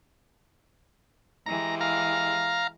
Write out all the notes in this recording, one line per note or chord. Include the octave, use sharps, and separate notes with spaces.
E3 G#3 G4 A#5
F5 A#5